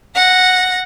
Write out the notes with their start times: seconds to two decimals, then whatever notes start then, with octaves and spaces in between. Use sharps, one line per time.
0.15 F#5 A#6